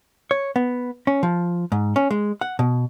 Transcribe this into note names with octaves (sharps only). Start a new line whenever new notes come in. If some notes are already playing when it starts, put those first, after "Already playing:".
C#5
B3
C#4
F3
G#2
C#4
G#3
F#5
B2